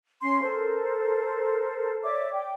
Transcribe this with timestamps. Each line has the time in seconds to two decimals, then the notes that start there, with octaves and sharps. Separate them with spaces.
0.22 C#4 C6
0.42 A4 A#4 C5
2.03 C#5 D5 E5 D6
2.33 G5